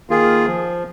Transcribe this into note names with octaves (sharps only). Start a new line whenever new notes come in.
D#3 A#3 F4 G#4
F3